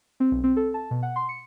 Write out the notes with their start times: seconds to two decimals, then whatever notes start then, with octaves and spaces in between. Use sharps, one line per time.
0.20 C4
0.31 B1
0.44 C4
0.56 A4
0.74 A5
0.91 B2
1.03 F#5
1.16 C6
1.29 C#7